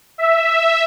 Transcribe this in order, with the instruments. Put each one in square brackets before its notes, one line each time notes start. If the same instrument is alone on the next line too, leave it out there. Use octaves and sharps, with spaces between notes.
[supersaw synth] E5